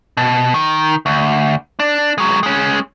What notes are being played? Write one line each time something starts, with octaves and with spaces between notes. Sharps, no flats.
B2
D#3
D2
D4
F#3 G#3
G#3 C#4